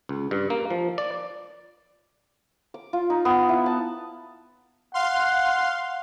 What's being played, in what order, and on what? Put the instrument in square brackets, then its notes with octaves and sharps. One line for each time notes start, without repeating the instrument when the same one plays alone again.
[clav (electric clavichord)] C#2
G2
A#3
F3
D5
[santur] D6
F4
D#4
B3
E4
A5
[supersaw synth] F5 C6 [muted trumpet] F#5